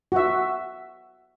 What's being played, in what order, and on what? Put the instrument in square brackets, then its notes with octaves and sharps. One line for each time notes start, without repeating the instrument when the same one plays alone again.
[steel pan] F#4 E5